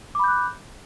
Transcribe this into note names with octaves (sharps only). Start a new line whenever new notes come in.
B5 D6 F#6 G6